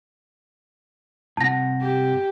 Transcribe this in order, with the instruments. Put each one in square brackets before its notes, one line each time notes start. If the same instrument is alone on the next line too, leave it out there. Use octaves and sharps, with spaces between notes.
[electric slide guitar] G2 C3 F#5 [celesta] A5 A#6
[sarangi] G4